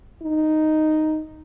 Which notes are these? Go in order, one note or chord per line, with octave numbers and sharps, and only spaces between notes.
D#4